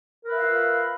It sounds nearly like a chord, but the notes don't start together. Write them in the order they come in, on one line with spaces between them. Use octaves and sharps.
A#4 B4 E5 F5 F4